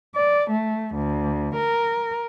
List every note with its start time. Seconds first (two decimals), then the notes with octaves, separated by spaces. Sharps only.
0.15 D5
0.51 A3
0.95 D2
1.55 A#4